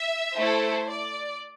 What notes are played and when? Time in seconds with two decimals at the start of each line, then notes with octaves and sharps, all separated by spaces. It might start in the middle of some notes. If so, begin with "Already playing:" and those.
Already playing: E5
0.35 A3 E4 A4 C5
0.88 D5